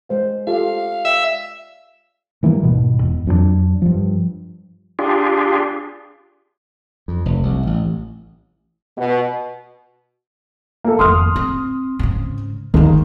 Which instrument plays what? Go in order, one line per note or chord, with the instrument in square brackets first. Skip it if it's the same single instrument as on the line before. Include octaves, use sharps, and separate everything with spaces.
[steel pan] G#3 C5 F5
[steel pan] F4 G4 A4 [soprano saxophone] F5
[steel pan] D5 G5 [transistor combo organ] E5
[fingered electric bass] D#3 E3 G3 A#3
D#1 G#2 B2
E2
F2 F#3 G#3 D4
G2 F3
[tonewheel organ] D4 F4 G4 G#4
[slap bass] F2
F1
C2
A1
[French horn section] B2
[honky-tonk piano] A#3 A4
[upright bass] G#1 F2 [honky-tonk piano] C6 D#6 F6
[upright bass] C4
G#2 C#3
[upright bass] G1 D#2 [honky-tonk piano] D#3 G#3 A#3